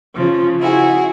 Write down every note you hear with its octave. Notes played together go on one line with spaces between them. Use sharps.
C#3 F3
E4 F#4 G#4